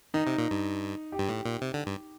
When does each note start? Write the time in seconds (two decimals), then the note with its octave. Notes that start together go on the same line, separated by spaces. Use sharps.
0.14 D#3 D#4
0.27 C3
0.38 A#2
0.51 G2
1.12 G4
1.19 G2
1.29 A2
1.45 A#2
1.62 C3
1.74 D3
1.87 G2